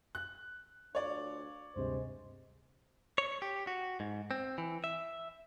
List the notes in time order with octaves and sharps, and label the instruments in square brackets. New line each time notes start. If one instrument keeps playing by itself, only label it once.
[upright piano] F#6
[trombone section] D2 D4 F4 [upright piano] C#5 D5
[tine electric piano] D2 G2 C3 [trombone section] G#3 C5
[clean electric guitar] C#5
G4
F#4
G#2
C4
E3
E5